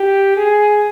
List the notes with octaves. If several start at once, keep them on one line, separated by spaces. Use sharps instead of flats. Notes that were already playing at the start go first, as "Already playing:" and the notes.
Already playing: G4
G#4